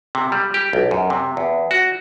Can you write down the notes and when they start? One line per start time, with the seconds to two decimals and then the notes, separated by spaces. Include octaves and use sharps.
0.15 C3
0.32 G3
0.54 G4
0.73 B1
0.91 F#2
1.10 C3
1.37 E2
1.71 F#4